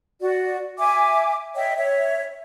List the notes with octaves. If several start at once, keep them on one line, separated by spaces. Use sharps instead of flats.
F#4 D5
E5 G#5 D6
C#5 D#5 E5 G5
C#5 E5